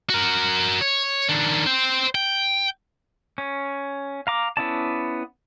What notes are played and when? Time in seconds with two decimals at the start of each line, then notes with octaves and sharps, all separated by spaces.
0.09 F#4 A#4
0.81 C#5
1.29 D#3 D4
1.66 C5 G5
2.15 G5
3.38 C#4
4.27 F5 A#5 D6
4.57 B3 C#4 E4 D5 A5